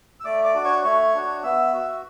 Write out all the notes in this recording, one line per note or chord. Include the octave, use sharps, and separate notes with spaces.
E6
A3 D5 D6
D5 D6
D4 F#4
C#5 C#6
A3 C#5 C#6
D4 F#4
B3 E5 E6
F#4